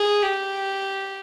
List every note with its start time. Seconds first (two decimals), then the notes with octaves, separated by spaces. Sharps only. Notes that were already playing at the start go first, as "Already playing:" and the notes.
Already playing: G#4
0.23 G4